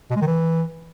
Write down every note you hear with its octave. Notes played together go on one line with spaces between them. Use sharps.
B2
G#3
D#3
E3